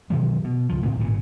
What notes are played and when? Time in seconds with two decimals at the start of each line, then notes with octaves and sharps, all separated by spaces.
0.10 B2 D#3 F#3 G#3
0.44 B2
0.69 C#2 F3
0.86 A2 C4
0.99 G#1 A#2 C#3